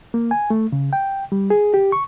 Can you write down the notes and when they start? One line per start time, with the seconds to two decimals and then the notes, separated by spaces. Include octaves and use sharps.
0.14 A#3
0.31 G#5
0.50 A3
0.72 C#3
0.93 G5
1.32 G3
1.50 G#4
1.74 G4
1.92 C#6